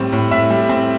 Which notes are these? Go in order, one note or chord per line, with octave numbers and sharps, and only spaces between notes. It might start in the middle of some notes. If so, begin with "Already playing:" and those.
Already playing: A2 G3 C4
A2
A2 E5
G3
C4